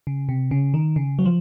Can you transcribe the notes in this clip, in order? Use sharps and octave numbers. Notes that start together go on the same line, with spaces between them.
C#3
C3
C#3
D#3
C#3
F#3
F3